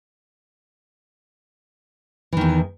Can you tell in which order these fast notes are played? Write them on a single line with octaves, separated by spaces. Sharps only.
E3 D#3 E2